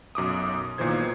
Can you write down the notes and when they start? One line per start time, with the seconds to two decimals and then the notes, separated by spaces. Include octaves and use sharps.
0.15 B1 F#2 D6 D#6
0.78 B1 A#2 D#3 E3 C5 G#6